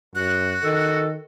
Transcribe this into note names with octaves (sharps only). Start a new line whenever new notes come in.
F#2 F#4 F#6
D#3 A4